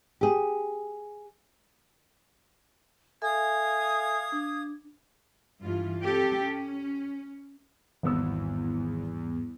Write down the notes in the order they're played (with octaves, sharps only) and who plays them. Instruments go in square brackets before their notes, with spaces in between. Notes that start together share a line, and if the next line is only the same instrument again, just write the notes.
[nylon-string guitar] G4 G#4
[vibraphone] A4 E5 G#5 [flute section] F5 D#6 G#6
[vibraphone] D4
[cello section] G2 E3 F4
C4 G4 A4
C#4
[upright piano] G#1 B3 E6 [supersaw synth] E2 [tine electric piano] G#2 G3